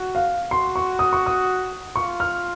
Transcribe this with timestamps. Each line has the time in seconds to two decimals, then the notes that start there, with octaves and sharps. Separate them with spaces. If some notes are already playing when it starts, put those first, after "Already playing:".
Already playing: F#4
0.15 F5
0.51 F#4 C6
0.76 C#6
0.99 D#6
1.13 C#6
1.26 D#6
1.96 F4 C#6
2.20 F6